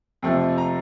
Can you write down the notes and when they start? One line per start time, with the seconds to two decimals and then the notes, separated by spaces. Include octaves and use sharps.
0.22 F2 C3 F3 A3 G5
0.58 A#5